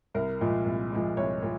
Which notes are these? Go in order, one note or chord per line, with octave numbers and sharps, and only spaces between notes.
C2 A#4
A#2 F3 G#3
C2
A#2 F3 G#3
C2 C#5
A#2